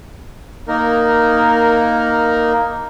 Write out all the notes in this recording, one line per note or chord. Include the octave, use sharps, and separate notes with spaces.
A#3 D#4 A#4